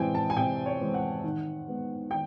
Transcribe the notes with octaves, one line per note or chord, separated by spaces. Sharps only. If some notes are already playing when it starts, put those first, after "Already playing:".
Already playing: C3 E3 G#3 C4 G5 G#5
A5
G#5
C3 G5
C#5
E3 G#3 C4
F#5
D#3
G#3 B3
D#3 G5